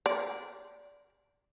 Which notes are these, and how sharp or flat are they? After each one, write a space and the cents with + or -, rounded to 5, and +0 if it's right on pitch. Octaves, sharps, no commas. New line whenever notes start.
D5 -15